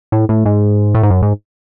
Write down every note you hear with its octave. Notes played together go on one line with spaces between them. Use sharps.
A2
A2
G#2
A2
G#2
F#2
G#2